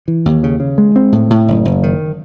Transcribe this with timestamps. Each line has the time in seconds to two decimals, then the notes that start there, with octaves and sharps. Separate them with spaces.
0.08 E3
0.26 D#2
0.43 C#3
0.60 C#3
0.78 G#3
0.96 C4
1.12 A2
1.30 A2
1.48 F#1
1.65 F#1
1.83 D#3